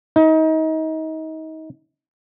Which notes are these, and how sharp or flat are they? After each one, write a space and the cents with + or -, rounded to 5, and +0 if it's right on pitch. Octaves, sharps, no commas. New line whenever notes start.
D#4 +30